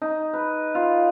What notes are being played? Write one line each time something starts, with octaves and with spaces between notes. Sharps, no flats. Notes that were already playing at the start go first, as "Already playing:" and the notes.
D#4
B4
F4